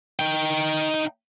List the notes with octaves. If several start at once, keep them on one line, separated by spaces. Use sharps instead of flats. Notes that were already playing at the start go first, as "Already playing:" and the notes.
D#4 G5